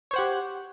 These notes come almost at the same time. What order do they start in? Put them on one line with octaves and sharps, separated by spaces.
C#5 C5 F#5 G4